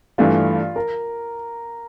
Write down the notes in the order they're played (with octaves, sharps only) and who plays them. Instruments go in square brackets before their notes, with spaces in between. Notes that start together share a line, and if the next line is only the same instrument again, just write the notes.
[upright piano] G2 E3 A3 D4 [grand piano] F4
[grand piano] A#4